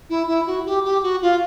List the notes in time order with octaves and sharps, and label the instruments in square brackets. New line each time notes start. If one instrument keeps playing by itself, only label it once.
[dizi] E4
E4
F#4
G4
G4
F#4
F4